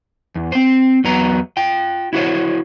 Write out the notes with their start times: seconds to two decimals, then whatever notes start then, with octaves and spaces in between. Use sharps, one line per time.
0.35 E2
0.52 C4 C5
1.04 E2 F#3 B3 A#5
1.57 F4 G5
2.13 E4 F#4 C5 C#5